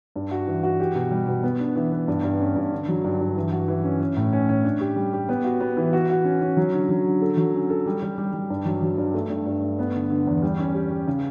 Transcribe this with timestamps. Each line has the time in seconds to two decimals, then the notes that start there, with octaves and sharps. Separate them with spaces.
0.16 G2
0.31 F#4
0.47 E3
0.63 F#4
0.80 G4
0.95 B2
1.11 G3
1.27 B2
1.43 B3
1.59 D4
1.75 E3
1.92 B3
2.08 G2
2.23 G2
2.40 C#4
2.56 G2
2.72 D3
2.89 F#3
3.04 G2
3.21 G2
3.36 E3
3.52 F#4
3.68 E3
3.84 C#4
4.01 C#4
4.17 A2
4.33 C#4
4.49 C#4
4.64 D4
4.80 G4
4.96 G3
5.13 G4
5.29 B3
5.44 F#4
5.60 B3
5.77 E3
5.93 F#4
6.10 F#4
6.25 C#4
6.41 C#4
6.57 F#3
6.74 D3
6.89 F#3
7.05 D3
7.21 A4
7.37 F#3
7.54 C#4
7.70 A4
7.86 G3
8.02 G3
8.18 G3
8.33 G3
8.50 G2
8.65 F#3
8.82 F#3
8.98 G2
9.14 A3
9.30 G2
9.46 G2
9.62 A3
9.79 B3
9.95 D3
10.10 D3
10.27 E2
10.42 G3
10.59 C#4
10.74 G4
10.90 G4
11.07 C#3